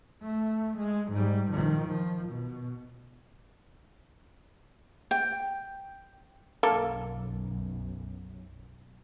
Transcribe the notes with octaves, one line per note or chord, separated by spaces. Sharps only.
A3
G#3
G#2 G3
D#3 F3
F3
B2
G5
B1 F#2 A#3 A4 A#4